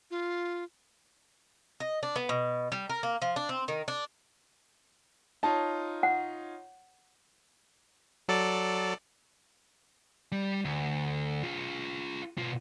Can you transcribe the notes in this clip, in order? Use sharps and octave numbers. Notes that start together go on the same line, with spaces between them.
F4
D#5
D4
B3
B2
G3
A#4
A#3
F3
D4
C4
D#3
D4
D#4 F4 C#5 A5
F#5
F#3 A4 D5
G3
D2
F4 G#4
B2 F4